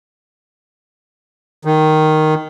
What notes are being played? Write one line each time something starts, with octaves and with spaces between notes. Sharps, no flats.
D#3